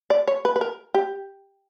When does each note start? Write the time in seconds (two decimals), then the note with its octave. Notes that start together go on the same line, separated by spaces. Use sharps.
0.10 D5
0.28 C#5
0.45 B4
0.56 B4
0.61 A#4
0.94 G4